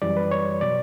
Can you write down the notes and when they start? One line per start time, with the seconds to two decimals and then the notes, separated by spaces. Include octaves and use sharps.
0.02 F#2 E3 G3 D5
0.17 B4
0.31 C#5
0.61 B2 F#3 D5